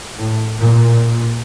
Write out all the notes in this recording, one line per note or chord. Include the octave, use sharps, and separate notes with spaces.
A2
A#2